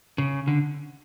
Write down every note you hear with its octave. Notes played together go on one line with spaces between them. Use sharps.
C#3
D3